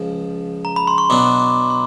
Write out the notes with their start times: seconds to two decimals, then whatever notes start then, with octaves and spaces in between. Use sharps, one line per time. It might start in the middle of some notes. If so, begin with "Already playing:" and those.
Already playing: C#2 C#3 F3
0.65 A#5
0.76 B5
0.87 C6
0.98 C#6
1.10 B2 F#3 B3 D4 D6
1.39 D6
1.70 C6